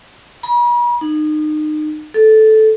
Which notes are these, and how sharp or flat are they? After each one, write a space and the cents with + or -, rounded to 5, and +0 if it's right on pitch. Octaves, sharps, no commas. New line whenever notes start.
B5 -45
D#4 -30
A4 -10